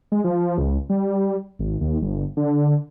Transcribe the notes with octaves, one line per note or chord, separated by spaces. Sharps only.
G#3
F3
C#2
G3
G#1
D#2
G1
D3